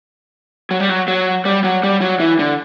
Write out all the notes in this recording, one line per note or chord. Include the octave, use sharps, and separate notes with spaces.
F#3
G3
F#3
F#3
G3
F#3
G3
F#3
E3
D3